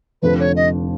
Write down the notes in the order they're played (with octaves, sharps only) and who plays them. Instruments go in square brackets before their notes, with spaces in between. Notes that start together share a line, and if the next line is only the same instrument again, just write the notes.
[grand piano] F1 F2 D3 [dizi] B4
[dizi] C#5
D#5